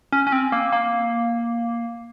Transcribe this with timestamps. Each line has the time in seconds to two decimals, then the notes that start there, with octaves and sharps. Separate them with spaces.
0.12 C#4
0.27 C#4
0.32 C4
0.52 A#3
0.73 A#3